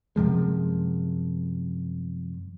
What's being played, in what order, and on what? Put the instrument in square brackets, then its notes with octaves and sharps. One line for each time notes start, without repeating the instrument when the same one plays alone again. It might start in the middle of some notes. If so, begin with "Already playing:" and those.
[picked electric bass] F#2 C3 F3 G#3